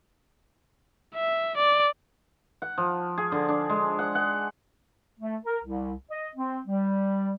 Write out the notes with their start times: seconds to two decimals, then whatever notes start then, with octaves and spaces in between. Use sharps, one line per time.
1.15 E5
1.58 D5
2.62 F#5
2.78 F3
3.18 G#4
3.32 D3
3.49 D4
3.70 G#3
3.99 F#5
4.15 F#5
5.20 A3
5.45 A#4
5.63 C2
6.10 D#5
6.36 C4
6.66 G3